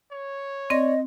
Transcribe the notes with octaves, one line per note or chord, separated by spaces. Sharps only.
C#5
C4 D5 D#5 A#6